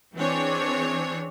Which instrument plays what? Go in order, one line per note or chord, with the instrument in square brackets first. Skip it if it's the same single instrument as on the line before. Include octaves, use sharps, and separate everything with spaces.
[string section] E3 C4 D4 G#4 C#5